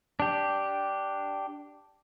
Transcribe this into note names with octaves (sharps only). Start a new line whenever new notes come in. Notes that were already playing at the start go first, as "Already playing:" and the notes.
D4 G4